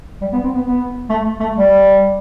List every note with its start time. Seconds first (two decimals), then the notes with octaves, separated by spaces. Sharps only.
0.21 G3
0.33 B3
0.44 C4
0.55 B3
0.67 B3
1.10 A3
1.40 A3
1.55 G3